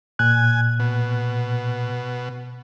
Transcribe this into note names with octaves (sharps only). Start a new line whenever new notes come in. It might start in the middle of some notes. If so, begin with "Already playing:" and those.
A#2 G#5 F#6
B2